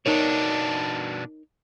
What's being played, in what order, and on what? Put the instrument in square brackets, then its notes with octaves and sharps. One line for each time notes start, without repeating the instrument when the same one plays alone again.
[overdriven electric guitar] B2 D4 [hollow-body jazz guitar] D#4 A#4 C#5